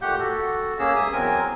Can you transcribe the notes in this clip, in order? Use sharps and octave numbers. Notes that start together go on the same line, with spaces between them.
A#2 A3 G4 F#5 G6
F#4 A4
A#3 C#4 G#4 E6
G2 E5 D#6
E2 F#3 C4 A#4 G#5